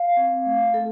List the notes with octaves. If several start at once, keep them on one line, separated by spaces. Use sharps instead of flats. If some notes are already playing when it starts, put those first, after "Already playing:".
Already playing: F5
C4
A3
C4 A4